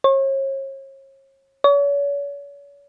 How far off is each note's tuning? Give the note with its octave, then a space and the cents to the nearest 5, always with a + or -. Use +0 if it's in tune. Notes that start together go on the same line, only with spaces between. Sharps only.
C#5 -40
C#5 +40